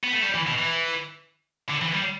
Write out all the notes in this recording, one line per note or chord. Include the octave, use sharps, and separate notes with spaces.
B3
A3
G3
E3
B2
E3
D3
E3
G3